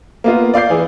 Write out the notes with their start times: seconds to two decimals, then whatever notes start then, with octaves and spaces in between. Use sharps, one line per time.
0.24 A#3 B3 F4
0.54 D5 F5 D6 G6 C7
0.70 E3 G#4